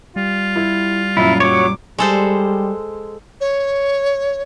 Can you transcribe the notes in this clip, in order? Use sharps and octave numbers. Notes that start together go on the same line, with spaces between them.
G3 F4
E4
F#2 A#2 E4
F#3 C#5 D6
G3 G#3 A4 C5
C#5